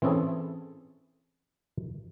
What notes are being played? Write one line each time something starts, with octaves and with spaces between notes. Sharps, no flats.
E3 C4 C#4 E4 G#4 A4